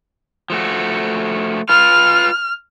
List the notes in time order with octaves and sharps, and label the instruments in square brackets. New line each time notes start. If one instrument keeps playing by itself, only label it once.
[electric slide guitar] F3 A3 F#4
[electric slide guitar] F4 B4 [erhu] F6